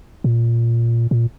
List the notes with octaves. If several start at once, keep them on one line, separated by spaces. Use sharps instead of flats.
A#2
A#2